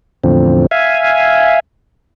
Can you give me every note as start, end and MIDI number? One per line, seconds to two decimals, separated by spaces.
0.24 0.66 40
0.24 0.66 45
0.24 0.66 50
0.24 0.66 53
0.24 0.66 60
0.71 1.60 76
0.71 1.60 77
0.71 1.60 80